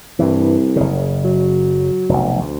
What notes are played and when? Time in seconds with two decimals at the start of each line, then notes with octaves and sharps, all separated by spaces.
0.19 C2 G2 E3
0.76 F#1 C#3
1.25 F#3
2.09 F1 B1
2.40 D2